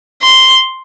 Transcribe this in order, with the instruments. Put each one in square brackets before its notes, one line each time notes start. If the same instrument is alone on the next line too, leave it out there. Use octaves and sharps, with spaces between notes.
[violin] C6